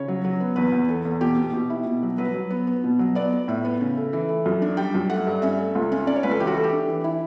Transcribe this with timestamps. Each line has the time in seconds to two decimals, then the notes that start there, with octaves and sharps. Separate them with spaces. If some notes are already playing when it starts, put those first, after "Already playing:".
Already playing: C#3 C#5
0.08 F#3
0.25 F#3
0.40 B3
0.56 E2 B4
0.72 E2
0.88 B3 A4
1.05 E2
1.21 B2 G4
1.38 B2
1.53 B2 G4
1.70 E4
1.86 B2
2.03 F#3
2.18 F#3 B4
2.34 F#3
2.50 B3
2.67 B3
2.84 B2
2.99 F#3
3.15 B3 D5
3.32 B3
3.48 A2 E5
3.65 B3
3.81 C#3
3.97 A3
4.13 E3
4.29 A3
4.46 F#2
4.62 D4
4.77 G3 G5
4.94 F#2
5.10 A3 F#5
5.27 G2
5.42 C#4 E5
5.59 A3
5.75 C#2
5.92 C#4
6.07 C#4 D5
6.16 C#5
6.23 C#2 B4
6.31 A4
6.40 E3 G4
6.47 F#4
6.56 A3 A4
6.64 G4
6.73 D4
6.88 E3
7.04 E4